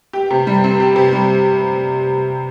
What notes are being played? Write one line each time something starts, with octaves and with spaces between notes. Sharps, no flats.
G4
C3
G3
C4
G4
C3
G3